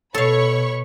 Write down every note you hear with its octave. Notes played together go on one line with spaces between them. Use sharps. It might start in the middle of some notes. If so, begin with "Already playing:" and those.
B2 A4 C#5 F5 B5 C#6